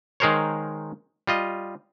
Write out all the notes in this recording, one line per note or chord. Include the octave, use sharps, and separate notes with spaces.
D#3 G#3 G#4 A#4 C5 C#5
G3 F4 D#5